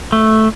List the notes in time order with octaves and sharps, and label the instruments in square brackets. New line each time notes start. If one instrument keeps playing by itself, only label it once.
[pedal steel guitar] A3